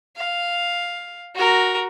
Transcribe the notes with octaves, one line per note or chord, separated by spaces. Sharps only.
F5
F#4 A#4